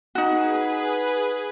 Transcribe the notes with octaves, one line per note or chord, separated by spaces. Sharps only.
D#4 F#4 G#4 B4